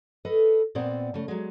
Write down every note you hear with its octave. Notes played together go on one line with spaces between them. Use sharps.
A4 B4 D#5
A#2 B3 C4 D5 F#5
C#3 A3
F#3 G#3